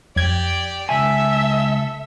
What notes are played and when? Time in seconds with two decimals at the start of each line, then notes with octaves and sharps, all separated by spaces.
0.16 F2 G4 D5 G#6
0.89 C#2 C#3 A4 E5 G#5 E6